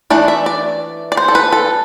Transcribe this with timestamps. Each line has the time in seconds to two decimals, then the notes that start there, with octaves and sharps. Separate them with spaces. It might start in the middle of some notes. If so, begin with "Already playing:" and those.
0.10 E3 A3 D4 D5
0.28 E5
0.46 D5
1.12 D5
1.17 C5
1.28 A4
1.35 B4
1.52 A4